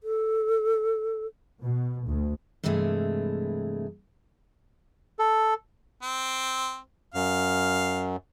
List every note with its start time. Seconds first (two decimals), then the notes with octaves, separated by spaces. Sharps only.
0.03 A4
1.61 B2
2.06 D2
2.64 G2 C3 E3 G#3 A3
5.19 A4
6.03 C4
7.14 F#2 F5